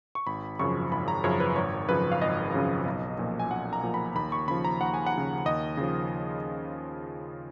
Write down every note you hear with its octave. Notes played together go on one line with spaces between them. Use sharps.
C#6
G#1 B5
F#2 C#3 F3 C#6
G#1 B5
A#5
F#2 C#3 F3 C#5
B4
G#1 C#5
F#2 C#3 F3 B4
F5
G#1 D#5
F#2 C#3 F3
B1
A#2 F3
G#5
B1 F#5
A#5
A#2 F3
B5
D#2 B5
C#6
C#3 F3 B5
A#5
D#2 F#5
G#5
F#5
C#3 F3
D#2 D#5
C#3 F3